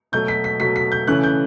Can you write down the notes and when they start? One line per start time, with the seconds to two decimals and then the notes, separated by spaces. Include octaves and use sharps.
0.12 B2 F#3 A3 G6
0.28 B6
0.44 B6
0.60 B2 F#3 A3 B6
0.76 B6
0.92 G6
1.07 C#3 E3 A3 C#4 F#6
1.24 G6